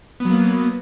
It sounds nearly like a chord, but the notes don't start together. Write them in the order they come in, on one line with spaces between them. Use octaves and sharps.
B3 F#3 A#3